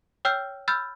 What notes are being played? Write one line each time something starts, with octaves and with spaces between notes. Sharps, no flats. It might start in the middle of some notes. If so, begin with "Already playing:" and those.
C#5 G5 E6 F6 G6
B5 E6 F6 G6 A6